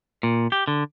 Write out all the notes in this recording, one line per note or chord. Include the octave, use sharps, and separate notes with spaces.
A#2
G4
D3